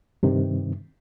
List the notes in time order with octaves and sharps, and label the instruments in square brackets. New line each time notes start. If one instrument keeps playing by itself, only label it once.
[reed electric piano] G2 C3 D#3